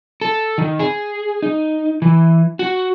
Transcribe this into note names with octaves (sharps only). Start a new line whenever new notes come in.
A4
D#3
G#4
D#4
E3
F#4